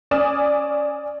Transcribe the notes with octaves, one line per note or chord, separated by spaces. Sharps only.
C#4 D5 G#5 D#6 F6 E7